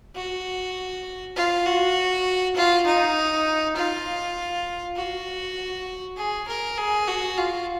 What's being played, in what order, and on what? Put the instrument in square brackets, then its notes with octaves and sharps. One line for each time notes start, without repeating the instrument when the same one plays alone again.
[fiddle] F#4
F4
F#4
F4
D#4
F4
F#4
G#4
A#4
G#4
F#4
F4